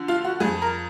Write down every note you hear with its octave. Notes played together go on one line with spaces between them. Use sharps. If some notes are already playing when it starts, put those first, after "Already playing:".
Already playing: D3 F3
F4
F#4
F2 F3 G#4
A#4